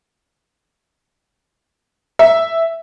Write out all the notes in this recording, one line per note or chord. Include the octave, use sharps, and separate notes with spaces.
E5